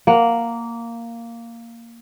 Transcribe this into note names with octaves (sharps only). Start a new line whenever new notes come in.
A#3 F#5